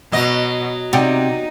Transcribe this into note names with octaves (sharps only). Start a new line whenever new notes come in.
B2 F#3 D#5
C3 D#4 D5 F#5 G5